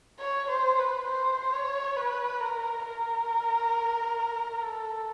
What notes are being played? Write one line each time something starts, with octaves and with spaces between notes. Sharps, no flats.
C#5
C5
B4
C5
C#5
B4
A#4
A#4
A4